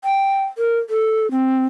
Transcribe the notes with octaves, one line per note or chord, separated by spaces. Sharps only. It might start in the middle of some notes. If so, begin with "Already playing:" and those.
G5
A#4
A4
C4